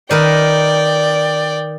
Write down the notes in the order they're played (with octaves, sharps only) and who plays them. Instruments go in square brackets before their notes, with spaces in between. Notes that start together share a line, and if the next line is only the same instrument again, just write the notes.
[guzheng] D#3 A#4 B4 [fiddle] D5 G5